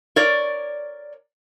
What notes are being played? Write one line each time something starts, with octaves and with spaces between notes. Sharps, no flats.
A#4 C#5 D5